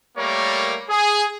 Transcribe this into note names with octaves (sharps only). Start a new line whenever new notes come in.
G3 A3 A#3 A#4 C#5
G#4